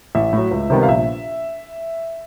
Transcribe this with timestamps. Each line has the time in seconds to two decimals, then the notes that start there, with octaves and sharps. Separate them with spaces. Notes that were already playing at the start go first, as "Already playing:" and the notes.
0.15 A1 E5
0.33 A2 F#3
0.51 C#2
0.70 C3 D#3 G3 B3
0.83 F5
0.88 A#1 E5